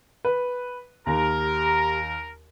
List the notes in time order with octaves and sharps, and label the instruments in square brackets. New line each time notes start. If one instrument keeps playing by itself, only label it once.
[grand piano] B4
[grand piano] D#2 [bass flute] G4 [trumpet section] A#4 [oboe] A#5